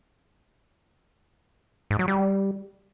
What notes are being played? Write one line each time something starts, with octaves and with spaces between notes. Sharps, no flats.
G#2
F#3
G3